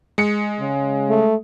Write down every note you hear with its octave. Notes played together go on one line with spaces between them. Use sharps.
G#3 C#7
C#3
A3